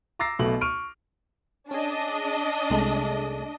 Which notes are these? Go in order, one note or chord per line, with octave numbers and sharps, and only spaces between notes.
A#5 D6 E6 A6 A#6 C7
B1 B2 A3 F#7
C#6 F6 D7 D#7
C#4 D4 G#4 D#5
C2 G#3 A3